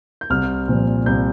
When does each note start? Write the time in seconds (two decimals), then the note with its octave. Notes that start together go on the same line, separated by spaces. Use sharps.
0.21 G6
0.30 C2 F6
0.68 A#2 F3
1.06 C2 G6